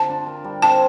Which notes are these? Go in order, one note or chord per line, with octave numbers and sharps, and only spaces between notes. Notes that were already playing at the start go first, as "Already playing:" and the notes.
Already playing: D3 C4 F4 A5
D4
A#4
G3
C4 A5